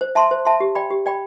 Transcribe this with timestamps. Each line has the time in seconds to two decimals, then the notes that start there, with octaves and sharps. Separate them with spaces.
0.01 C5
0.15 E5 A5 C6
0.31 C5
0.45 E5 A5 C6
0.60 G4
0.75 D5 G5 B5
0.90 G4
1.06 D5 G5 B5